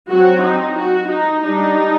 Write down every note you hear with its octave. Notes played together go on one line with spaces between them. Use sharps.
F#3 C4 F#4
D#4
F#4
D#4
G3 D4 D#4